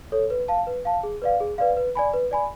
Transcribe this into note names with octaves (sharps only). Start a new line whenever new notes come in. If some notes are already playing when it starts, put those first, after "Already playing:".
A4 C#5
B4
F5 A5
B4
F5 A5
G#4
B4 D5 F5
G#4
B4 D5 F5
B4
D5 G#5 B5
B4
D5 G#5 B5